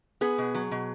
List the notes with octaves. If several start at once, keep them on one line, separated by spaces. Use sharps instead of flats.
B3 G#4
B2
F#3
B2